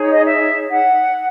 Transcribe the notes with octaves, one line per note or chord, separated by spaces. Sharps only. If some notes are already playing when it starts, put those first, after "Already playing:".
Already playing: D#4 G#4 C#5
D#5
E5
F#5